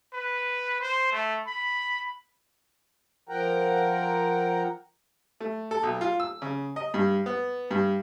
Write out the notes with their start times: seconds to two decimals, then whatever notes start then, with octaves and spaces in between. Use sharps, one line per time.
0.13 B4
0.81 C5
1.12 A3
1.46 B5
3.29 F3 A#4 F#5 G5 A#5
5.40 A3
5.71 A4
5.83 B1
6.01 F4
6.20 E6
6.42 C#3
6.76 D#5
6.94 G2
7.26 B3
7.71 G2